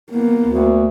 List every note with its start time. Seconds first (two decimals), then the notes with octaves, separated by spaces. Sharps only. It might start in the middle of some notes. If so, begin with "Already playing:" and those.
0.12 A#3 B3
0.47 D2